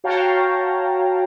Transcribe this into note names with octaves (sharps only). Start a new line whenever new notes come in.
F#4 C#5 F5 G5 A5 A#5